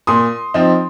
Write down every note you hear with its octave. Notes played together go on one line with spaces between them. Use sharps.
A#2 C6 D#6
F3 C4 D#4